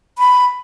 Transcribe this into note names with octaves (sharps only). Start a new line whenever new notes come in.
B5